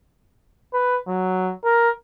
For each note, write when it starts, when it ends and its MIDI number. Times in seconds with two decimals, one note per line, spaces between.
0.74 1.00 71
1.08 1.52 54
1.65 1.90 70